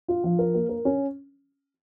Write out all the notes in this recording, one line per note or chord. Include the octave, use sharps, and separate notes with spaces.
F4
F3
A#4
A#3
A#4
C#4